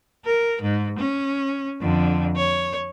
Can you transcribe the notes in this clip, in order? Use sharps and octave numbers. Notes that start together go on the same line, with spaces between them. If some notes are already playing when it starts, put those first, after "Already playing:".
A#4
G#2
C#4
F2 D3
C#5